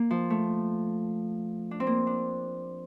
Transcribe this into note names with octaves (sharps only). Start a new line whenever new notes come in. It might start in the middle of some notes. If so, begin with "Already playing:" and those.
Already playing: A#3
F3
A3
D4
C4
A#3
D4